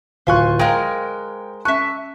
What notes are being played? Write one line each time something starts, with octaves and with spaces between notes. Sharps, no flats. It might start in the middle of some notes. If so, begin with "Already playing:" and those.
D1 F4 C5 F5 G#5 C6 C#6 F#6
G#3 A#4 E5 F5 G5 A#5
C#4 E5 A5 C#6 F#6